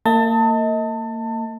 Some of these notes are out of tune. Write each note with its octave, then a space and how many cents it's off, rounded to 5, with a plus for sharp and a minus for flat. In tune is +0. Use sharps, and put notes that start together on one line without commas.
A#3 -30 D#5 +35 A5 +25